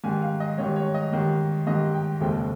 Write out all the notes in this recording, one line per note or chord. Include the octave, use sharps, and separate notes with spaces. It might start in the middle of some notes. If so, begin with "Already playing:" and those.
G#2 D#3 G3 G#5
F5
D#5
G#2 D#3 G3 C#5
C#5
D#5
G#2 D#3 G3
G#2 D#3 G3 D#5
G5
F1 D#2 C#3 G#3 C4 G5